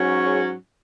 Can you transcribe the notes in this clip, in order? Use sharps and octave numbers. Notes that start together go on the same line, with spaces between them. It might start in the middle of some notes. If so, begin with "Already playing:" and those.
Already playing: G#2 F#3 C#4
G#4 C#5